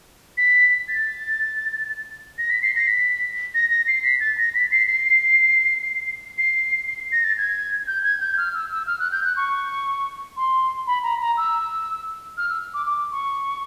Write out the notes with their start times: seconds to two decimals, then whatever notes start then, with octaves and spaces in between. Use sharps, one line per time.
0.38 B6
0.88 A6
2.38 A#6
2.50 B6
2.63 C7
2.76 A#6
2.87 B6
3.54 A#6
3.70 A#6
3.88 C7
4.04 B6
4.20 A6
4.37 A#6
4.55 B6
4.72 C7
4.88 C7
6.38 C7
6.87 C7
7.12 A#6
7.24 A6
7.38 G#6
7.87 G6
8.04 G#6
8.20 G6
8.37 F6
8.54 E6
8.71 E6
8.87 F6
8.99 F#6
9.12 G6
9.24 F#6
9.37 C#6
10.37 C6
10.87 B5
11.03 A#5
11.20 A#5
11.37 E6
12.37 F6
12.50 E6
12.74 D6
12.86 D6
13.11 C#6